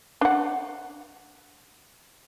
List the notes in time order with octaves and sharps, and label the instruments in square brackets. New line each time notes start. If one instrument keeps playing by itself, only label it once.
[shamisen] D4 F#5